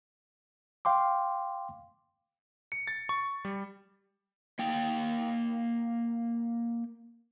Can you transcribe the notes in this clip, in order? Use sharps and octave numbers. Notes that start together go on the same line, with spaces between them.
F5 G5 C6 D6
C#7
A6
C#6
G3
A#3 G5